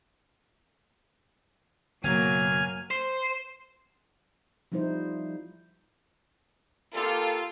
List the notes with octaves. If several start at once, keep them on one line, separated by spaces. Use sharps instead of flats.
F#1 B2 F#3 A#3 G#5 F6
C5
F3 G3 D#4 E4 C5
A#3 F4 G4 A4